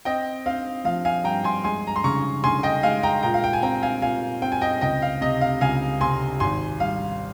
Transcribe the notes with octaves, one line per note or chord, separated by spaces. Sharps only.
C4 D#5 G5
C4 F5
F3 F5
F5 G#5
G2 G5 A#5
G#5 C6
G#3 G#5 C6
A#5
C6
C#3 A#5 C#6
C#3 G#5 C6
D#5 G5
G#3 F5 G#5
G5 A#5
A#2 G5 A#5
F5
G5
G#5
C4 G5 A#5
F5 G#5
A#2 F5 G#5
C4 G5
G#5
D#5 G5
C#2 D#5 G5
F5
C3 D#5
F5
C#2 F5 G#5
C3 G#5 C6
G#1 G#5 C6
G3 F5